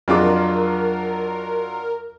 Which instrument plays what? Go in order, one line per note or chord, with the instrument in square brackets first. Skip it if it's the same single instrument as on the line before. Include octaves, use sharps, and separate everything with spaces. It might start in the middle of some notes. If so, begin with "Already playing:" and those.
[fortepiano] F2 G#4 D6 [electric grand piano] F#3 D4 F4 [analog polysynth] A#4